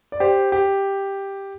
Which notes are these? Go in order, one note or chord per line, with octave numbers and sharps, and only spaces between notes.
D5
G4 C5
G4